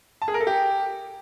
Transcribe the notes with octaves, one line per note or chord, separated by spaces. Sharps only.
A5
G#4
A#4
A4
G4